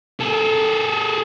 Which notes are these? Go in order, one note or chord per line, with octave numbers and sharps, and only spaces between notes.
G#4 A4